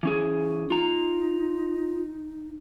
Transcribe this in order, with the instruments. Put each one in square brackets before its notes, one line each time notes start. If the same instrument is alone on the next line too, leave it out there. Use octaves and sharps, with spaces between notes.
[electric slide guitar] E3 C#4 G#4
[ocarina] D#4 [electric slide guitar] F4 A#5